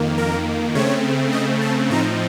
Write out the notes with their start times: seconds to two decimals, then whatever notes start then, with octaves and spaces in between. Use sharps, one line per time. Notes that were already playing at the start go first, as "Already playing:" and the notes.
Already playing: F2 D#3 A#3
0.18 A#4
0.75 C#3 A3 C4 C#5
1.33 D#5
1.61 A5
1.90 A2 F3 C4 D#4 A#5